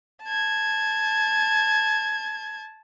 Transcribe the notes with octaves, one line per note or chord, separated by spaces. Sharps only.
A5 G#6